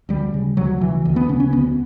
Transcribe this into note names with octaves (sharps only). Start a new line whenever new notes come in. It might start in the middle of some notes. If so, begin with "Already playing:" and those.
D2 G3
C#3
D2 F#3
C#3 E3
D2
B3
C#3 C#4
C#4
D2 B3